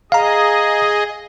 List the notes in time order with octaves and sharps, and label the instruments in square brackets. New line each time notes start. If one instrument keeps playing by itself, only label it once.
[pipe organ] G#4 D#5 [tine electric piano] F5 A#5